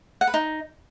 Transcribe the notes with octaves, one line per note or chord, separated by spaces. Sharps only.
F#5
B4
D#4